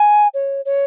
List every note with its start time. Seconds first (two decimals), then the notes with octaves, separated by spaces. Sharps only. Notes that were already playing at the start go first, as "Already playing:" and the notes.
Already playing: G#5
0.34 C#5
0.65 C#5